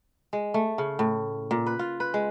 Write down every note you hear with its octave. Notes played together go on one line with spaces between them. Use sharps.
G#3
A3
C#3
A2
A#2
B4
F4
B4
G#3